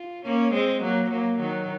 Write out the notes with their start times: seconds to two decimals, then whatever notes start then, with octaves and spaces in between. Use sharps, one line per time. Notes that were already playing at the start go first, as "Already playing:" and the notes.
Already playing: F4
0.26 A#3 C#4
0.54 G#3 C4
0.83 F#3 A#3
1.11 F#3 A#3
1.39 D#3 F#3